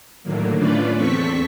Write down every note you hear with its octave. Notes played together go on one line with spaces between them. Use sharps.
A2 D3 D#3 F#3 A#3
A3 C#4 D4 F4 B4 D5
E2 C4 A4 C#6 B6